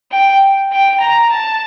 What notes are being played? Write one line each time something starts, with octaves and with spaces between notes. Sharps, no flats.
G5
G5
A#5
A5